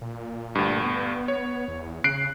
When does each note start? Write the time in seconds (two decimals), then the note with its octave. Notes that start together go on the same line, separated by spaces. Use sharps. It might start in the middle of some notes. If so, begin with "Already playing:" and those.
0.01 A#2
0.55 D2 G2
0.84 B3
1.28 C#5
1.68 E2
2.04 C#3 F#6 C7 D7